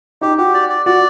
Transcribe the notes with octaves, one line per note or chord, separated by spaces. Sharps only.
D#4 G4
F#4 G4
D5
D5
F#4 D5